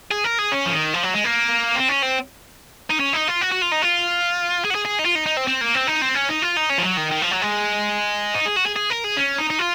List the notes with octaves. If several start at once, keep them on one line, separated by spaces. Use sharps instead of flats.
G#4
A#4
G#4
C#4
F3
D#3
F3
F#3
G#3
A#3
C4
C#4
C4
D#4
C#4
D#4
F4
F#4
F#4
F4
D#4
F4
G#4
F#4
G#4
G#4
D#4
F4
D#4
D#4
C4
C4
A#3
C4
D#4
C4
C#4
D#4
F4
D#4
C#4
F3
F#3
D#3
D#3
F3
F#3
G#3
D#4
G#4
F#4
G#4
G#4
A#4
G#4
C#4
D#4
D#4
F4